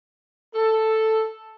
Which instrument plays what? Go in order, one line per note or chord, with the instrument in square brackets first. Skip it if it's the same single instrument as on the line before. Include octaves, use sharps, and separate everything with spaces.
[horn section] A4